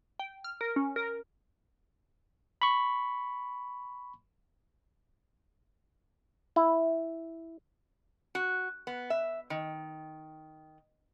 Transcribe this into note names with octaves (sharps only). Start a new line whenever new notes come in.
G5
F6
A#4
C#4
A#4
B5 C#6
E4
F#4
B3
E5
D#3